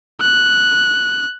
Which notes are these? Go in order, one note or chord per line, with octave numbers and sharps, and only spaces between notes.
F#6